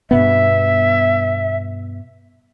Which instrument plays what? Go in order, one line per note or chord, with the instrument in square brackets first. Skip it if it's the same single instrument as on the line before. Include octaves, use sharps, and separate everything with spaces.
[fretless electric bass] G2 B2 B3 [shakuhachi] E5